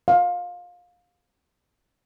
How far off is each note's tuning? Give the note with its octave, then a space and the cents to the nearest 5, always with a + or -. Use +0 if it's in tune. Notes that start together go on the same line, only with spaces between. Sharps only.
F5 +25